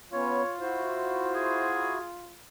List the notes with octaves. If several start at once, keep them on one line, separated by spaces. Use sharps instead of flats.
B3 C#4 F4 C#5
E4 F#4 C5
G#4